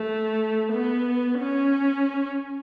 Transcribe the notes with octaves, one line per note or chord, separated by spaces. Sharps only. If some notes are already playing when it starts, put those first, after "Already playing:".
Already playing: A3
B3
C#4